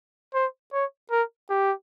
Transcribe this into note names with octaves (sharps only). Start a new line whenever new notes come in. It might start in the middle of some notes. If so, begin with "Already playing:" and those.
C5
C#5
A#4
G4